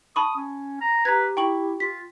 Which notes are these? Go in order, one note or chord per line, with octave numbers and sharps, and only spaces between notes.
A5 B5 C#6 D#6
C#4
A#5
G4 B4 A#5 G#6
E4 G5 C#6 F#7
F4 B6